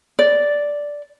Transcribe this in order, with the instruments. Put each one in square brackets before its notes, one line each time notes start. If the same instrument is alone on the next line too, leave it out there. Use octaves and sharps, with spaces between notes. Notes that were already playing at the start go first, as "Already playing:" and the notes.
[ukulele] D5